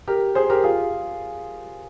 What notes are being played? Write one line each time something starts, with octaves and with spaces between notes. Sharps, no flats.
G4 A#4
G#4 C5
G4 A#4
F4 G#4